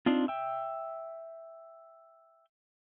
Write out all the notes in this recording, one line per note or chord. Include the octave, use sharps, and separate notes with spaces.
C4 D4 D#4 F4
E5 G5